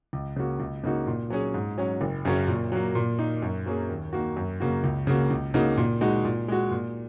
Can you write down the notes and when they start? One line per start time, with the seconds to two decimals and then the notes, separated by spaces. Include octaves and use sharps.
0.13 C#2
0.36 C#3 A#3 F#4
0.60 C#2
0.84 C#3 A#3 D#4 F#4
1.07 A#2
1.30 F#3 C#4 G#4
1.54 G#2
1.78 F#3 C#4
2.01 F#1
2.25 F#2 C#3 F#3 C#4
2.48 A#2
2.72 F#3 A#3
2.95 A#2
3.19 A#3 D#4
3.42 F#2
3.66 F#3 A#3 C#4 G#4
3.89 D#2
4.13 D#3 A#3 F#4
4.37 F#2
4.60 C#3 A#3 F#4
4.84 C#2
5.07 C#3 A#3 F#4
5.30 C#2
5.54 C#3 A#3 D#4 F#4
5.77 A#2
6.01 G#3 D#4 F#4
6.25 A#2
6.48 G#3 F#4
6.71 A#2